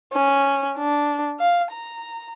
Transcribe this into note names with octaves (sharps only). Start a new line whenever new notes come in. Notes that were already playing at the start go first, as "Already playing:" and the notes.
C#4
D4
F5
A#5